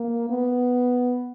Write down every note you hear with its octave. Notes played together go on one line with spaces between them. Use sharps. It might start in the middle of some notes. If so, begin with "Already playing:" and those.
Already playing: A#3
B3